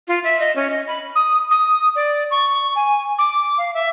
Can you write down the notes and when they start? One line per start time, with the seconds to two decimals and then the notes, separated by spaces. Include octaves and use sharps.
0.08 F4
0.24 E5
0.39 D#5
0.56 C#4
0.70 D#5
0.87 B5
1.15 D#6
1.51 D#6
1.96 D5
2.31 C#6
2.76 G#5
3.18 D6
3.58 F5
3.74 E5